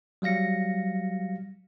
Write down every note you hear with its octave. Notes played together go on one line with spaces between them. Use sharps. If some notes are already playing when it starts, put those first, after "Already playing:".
F#3 G3 F5 A#6 C#7